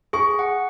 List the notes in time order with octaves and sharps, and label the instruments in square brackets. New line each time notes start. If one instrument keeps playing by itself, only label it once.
[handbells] G#4 [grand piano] C#6
[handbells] F#5